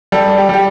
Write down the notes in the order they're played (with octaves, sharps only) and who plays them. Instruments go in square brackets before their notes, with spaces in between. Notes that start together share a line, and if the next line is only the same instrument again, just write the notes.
[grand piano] G3 [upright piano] A4
[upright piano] G4
[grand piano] G3 [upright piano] G4